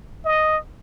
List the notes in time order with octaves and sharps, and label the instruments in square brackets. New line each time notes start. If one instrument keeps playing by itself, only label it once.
[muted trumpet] D#5